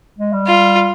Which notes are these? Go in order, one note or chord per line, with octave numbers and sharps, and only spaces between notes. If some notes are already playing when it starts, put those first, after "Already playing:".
G#3
G3
F4